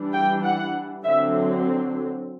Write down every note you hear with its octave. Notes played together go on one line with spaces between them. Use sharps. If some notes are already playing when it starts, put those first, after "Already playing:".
Already playing: E3 G3 D4
G5
F#5
D3 F#3 C4 E5